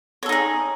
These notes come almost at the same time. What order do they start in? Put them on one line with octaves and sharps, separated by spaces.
C#5 A4 D#4 G#4